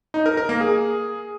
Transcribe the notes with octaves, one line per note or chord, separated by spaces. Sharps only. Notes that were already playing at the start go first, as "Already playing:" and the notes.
D#4
A#4
A#4
A#3
G#4